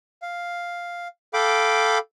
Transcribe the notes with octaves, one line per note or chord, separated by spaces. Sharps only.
F5
A4 F5 G5 B5 D6